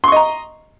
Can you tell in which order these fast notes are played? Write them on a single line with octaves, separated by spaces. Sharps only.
C6 C#6 D#5 A#5